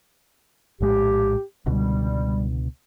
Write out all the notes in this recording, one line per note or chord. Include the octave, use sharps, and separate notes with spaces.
A#1 A2 G#3 G4
C#2 B2 D3 G3